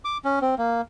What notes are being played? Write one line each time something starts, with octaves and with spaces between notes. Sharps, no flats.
D6
C#4
C4
A#3